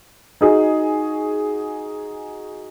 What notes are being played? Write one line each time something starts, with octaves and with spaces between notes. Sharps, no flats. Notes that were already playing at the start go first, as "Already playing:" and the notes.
D#4 F#4 G#4 D#5